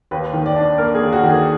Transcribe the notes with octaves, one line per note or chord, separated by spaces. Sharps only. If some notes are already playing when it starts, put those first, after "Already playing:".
D#2 B4
D#3
D5
D4
A#3 A#4
G#4
D#2
F#4
D#3
G#4